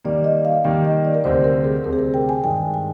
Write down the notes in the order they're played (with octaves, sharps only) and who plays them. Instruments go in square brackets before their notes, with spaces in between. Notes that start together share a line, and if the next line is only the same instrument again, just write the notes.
[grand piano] D#3 G3 A#3 [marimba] D5
[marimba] D#5
F5
[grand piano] D#3 G3 A#3 [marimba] G5
[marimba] D#5
D5
A#4
[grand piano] D2 C3 G3 C4 [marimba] C5
[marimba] A#4
G#4
[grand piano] D2 C3 G3 C4 [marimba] A#4
[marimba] G#4
A#4
G5
G#5
[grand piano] G2 D#3 G#3 [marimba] G5
[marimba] G#5